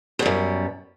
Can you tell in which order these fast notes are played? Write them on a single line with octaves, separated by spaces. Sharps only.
B2 G3 F#2